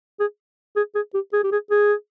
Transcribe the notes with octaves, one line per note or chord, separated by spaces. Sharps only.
G#4
G#4
G#4
G4
G#4
G4
G#4
G#4